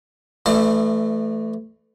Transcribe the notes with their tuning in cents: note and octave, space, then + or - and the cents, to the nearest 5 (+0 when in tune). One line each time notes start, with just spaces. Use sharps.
E3 +25 A3 +0 D5 +45